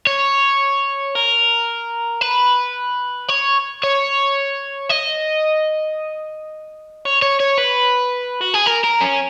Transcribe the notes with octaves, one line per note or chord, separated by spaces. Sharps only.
C#5
A#4
B4
C#5
C#5
D#5
C#5
C#5
C#5
B4
F#4
G#4
A#4
A#4
C#4